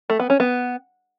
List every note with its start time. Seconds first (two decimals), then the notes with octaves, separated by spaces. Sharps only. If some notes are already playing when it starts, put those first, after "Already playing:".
0.10 A3
0.20 B3
0.30 C#4
0.40 B3